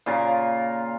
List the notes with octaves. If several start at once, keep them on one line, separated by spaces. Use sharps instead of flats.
A#2 C#3 F4 A#4